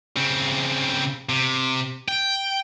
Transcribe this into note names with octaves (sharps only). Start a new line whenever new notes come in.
C#3 C4
C3
G5